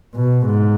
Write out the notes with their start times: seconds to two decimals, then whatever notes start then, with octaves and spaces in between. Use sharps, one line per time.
0.15 B2
0.47 G#2